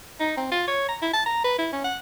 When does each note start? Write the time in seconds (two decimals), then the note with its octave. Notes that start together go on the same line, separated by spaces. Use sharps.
0.20 D#4
0.37 C4
0.51 F4
0.67 C#5
0.88 A#5
1.02 E4
1.13 A5
1.26 A#5
1.44 B4
1.58 E4
1.72 C#4
1.84 F#5